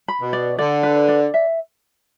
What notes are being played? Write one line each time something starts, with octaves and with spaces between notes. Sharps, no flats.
B5
B2
D5
D3 D5
B4
D5
E5